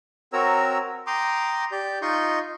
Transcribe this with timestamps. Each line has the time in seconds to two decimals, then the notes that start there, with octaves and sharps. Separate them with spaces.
0.33 C4 F#4 A#4 C#5 A#5 E6
1.07 G5 A#5 C6 D6 D#6
1.72 G4 D5 G6
2.02 D#4 F4 D#5 C6 C#6 G6